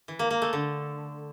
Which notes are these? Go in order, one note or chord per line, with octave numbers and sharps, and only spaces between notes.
E3
A#3
A#3
A3
D3